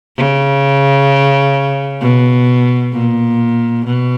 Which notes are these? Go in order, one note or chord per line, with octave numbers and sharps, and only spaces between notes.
C#3
B2
A#2
B2